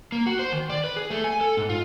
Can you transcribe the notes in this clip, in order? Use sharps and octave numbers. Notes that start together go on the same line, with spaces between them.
A#3
F#4
C5
D#3
D5
B4
G#4
A3
G#5
A4
G#2
F4